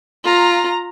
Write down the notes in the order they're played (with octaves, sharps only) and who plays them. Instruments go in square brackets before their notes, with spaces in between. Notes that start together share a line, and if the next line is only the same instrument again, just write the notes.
[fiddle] F4 [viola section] A#5